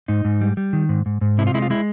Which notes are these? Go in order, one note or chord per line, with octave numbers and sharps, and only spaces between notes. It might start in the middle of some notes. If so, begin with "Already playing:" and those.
G#2 D#4
G#2
G3
G3
D#3
G#2
G#2
G#2
C3 E4
F4
G#3 E4
F4
G#3 E4